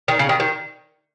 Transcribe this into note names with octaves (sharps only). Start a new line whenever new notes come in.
D#3
C#3
D#3
D#3